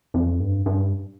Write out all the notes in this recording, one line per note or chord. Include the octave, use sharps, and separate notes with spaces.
F2
G2
G2